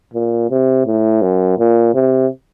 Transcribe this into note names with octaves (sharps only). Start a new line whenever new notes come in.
A#2
C3
A2
F#2
A#2
C3